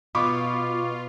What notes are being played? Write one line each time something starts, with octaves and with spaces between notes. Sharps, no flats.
B2 F4 B5 C#6 D6